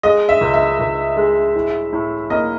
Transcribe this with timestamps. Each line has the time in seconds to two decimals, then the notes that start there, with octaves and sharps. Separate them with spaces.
0.03 G#3 D#5
0.29 E5
0.41 C#2
0.54 E5
0.79 C#2
1.17 G#3
1.55 A2
1.93 A2
2.30 A#3 D#5